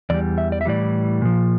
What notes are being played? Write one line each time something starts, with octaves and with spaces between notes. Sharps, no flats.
E2 E3 G3 D5
E5
D5
E5
A2 E3 G3 D5
A#2 F3